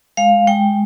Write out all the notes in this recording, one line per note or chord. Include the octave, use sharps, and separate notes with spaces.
G#3 F5
G#3 G5